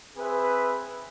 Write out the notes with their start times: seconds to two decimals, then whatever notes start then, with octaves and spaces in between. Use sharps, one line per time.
0.16 C4 G#4 B4 E5